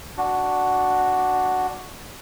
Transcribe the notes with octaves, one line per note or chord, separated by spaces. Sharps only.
D4 F#4